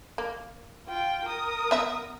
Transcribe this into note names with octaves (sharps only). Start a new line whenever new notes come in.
A#3
F4 G5
A#4 D#6
B3 E5